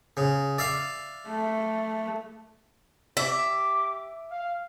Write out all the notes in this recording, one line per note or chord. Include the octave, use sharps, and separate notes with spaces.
C#3
D5 E5 F5
A3
G4 E5 D6
F5